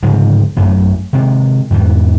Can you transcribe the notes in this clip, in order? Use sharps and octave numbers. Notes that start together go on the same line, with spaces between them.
D1 G#2 C#3 F3
A1 F#2 F#3 A3
C3 D#3 G#3
E2 G#2 D#3 E3